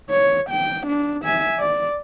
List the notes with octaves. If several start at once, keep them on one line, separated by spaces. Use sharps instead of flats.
C#5
G5
D4
E5 G#5
D5